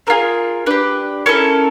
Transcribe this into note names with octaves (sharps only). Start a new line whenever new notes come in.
C4 F4 G#4 A#4
D4 G4 B4
C#4 E4 A4 A#4